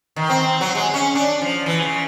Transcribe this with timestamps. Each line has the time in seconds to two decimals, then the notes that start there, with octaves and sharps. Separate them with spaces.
0.16 D#3
0.30 C4
0.61 F#3
0.75 G#3
0.94 C#4
1.15 D4
1.41 F3
1.66 E3
1.82 C#3